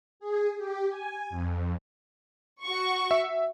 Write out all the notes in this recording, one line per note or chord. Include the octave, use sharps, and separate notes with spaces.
G#4
G4
G#5
F2
F#4 C#6
E5